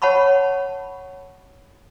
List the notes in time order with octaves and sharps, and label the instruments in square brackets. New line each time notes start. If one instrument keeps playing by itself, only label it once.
[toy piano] C#5 F#5 A5 B5 C#6